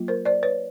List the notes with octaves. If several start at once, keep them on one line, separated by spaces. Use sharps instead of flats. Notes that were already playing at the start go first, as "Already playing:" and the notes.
Already playing: F#3 A#3 F4
A#4 C5
C5 D5
B4 C#5